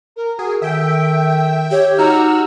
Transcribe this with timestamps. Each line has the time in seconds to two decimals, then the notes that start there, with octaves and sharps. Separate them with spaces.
0.16 A#4
0.39 F#4 G#4
0.62 D#3 A4 E5 G5
1.71 G4 C#5
1.98 D#4 F#4 A#5 E6 F6